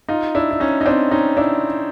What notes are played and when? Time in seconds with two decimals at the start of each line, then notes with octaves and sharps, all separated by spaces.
0.08 D#4 F4
0.35 D4 E4
0.51 E4
0.60 C#4 D#4
0.81 D#4
0.86 C4 D4
1.11 C#4 D#4
1.37 D4 E4